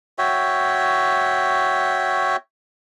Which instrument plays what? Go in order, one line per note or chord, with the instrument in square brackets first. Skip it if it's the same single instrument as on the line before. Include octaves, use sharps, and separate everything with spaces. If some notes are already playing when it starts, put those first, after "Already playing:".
[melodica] F#4 C#5 E5 G5